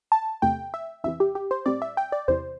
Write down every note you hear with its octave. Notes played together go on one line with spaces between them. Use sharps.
A5
E2 C3 A3 G5
E5
E2 C3 E3 E5
G4
G4
C5
A2 G3 C4 D5
E5
G5
D5
E2 C3 E3 C5